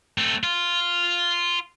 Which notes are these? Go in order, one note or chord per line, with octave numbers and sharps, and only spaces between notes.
A3 C4
F4